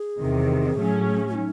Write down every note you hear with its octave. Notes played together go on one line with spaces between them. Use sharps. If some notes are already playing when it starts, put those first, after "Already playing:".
Already playing: G#4
E2 C3 D#3
A2 F#3 A3 C#4
D#4